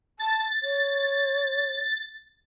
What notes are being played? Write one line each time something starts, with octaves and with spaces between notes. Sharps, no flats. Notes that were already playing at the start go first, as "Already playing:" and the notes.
A5 A6
C#5